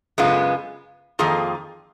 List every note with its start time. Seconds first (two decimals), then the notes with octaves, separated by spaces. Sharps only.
0.18 F#2 C#3 G#3 B3 F4
1.19 F2 D#3 A#3 F4 G#4